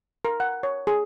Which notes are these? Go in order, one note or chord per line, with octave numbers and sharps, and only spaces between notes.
A#4
F#5
C#5
G#4